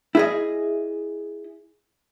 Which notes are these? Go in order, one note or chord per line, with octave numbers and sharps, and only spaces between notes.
E4 G#4 D#5